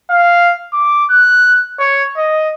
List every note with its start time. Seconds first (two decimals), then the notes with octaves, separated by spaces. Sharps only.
0.10 F5
0.73 D6
1.10 F#6
1.79 C#5
2.17 D#5